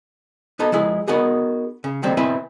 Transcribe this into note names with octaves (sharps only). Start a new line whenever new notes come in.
B3 D#4 A4 A#5
F3 G#3 E4 G#4
B3 D#4 F#4 G#4 A#4
C#3
D3 D#3 G3 A#3 C4 D#4
B2 C4 E4 B4 E5 G#5